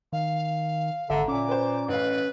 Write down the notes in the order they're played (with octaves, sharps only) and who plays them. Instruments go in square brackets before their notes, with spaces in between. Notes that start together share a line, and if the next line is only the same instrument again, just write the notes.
[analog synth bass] D#3 [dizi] F5
[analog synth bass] G#1 [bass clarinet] D3 [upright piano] E5 A#5
[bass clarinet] A#2 [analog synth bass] C#4 [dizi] D6
[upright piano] B4 C5
[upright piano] A1 F5 [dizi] B4